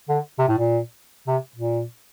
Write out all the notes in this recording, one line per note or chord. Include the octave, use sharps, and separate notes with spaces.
D3
C3
A2
A#2
C3
A#2